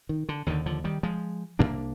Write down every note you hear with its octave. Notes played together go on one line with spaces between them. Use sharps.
D#3
D3
D#2 D3 D#3
D3 F3
D#3 G3
F3 G#3
A#2 A#3 D4
C2